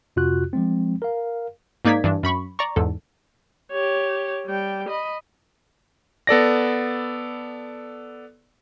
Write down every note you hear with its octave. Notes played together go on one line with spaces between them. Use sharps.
F2 C3 F4 F#4 F#6
F3 G#3 C4
A#4 F5
G#2 A#3 D#4 D5 G#6 B6
G2 E3 D4
F#2 B5 C#6
D5 A#5 C#6
E2 G#2 A4
G4 C#5
G3 G5
D#5 B5
B3 A4 D5 A#6